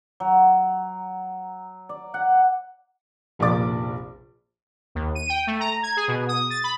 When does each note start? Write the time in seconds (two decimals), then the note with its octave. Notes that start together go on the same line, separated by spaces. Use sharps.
0.20 F#3
1.89 D5
2.14 F#5
3.39 F1 A#1 A#3 D5 D6 A6
4.95 D#2
5.15 D#7
5.29 G5
5.47 A3
5.60 A#5
5.83 G#6
5.97 G#4
6.08 B2
6.29 D#6
6.50 A6
6.64 B5